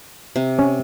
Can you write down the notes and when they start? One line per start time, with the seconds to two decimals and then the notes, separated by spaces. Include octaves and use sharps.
0.36 C3
0.59 C#4